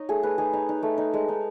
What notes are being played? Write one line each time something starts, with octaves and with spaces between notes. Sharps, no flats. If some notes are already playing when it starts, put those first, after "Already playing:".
Already playing: D#4 C#5 D#5
A3 G#4
A3 B4
D#4 G#4
D#4
D#4
A3
D#4
G#3
D#4